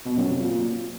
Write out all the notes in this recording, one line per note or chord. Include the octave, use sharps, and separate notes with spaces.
B2
F#2
C3
A#2